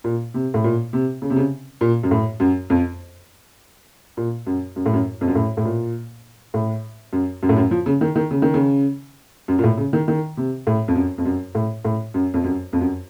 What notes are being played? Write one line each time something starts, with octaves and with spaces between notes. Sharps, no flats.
A#2
C3
A2
A#2
C3
C#3
C3
C#3
A#2
F#2
A2
F#2
F2
A#2
F#2
F#2
A2
F#2
F2
F#2
A2
A2
A#2
A2
F#2
F#2
A2
F#2
F3
C#3
D#3
D#3
C#3
D#3
C#3
F#2
A#2
A2
C#3
D#3
D#3
C3
A2
F2
F#2
F2
F#2
A2
A2
F#2
F2
F#2
F2
F#2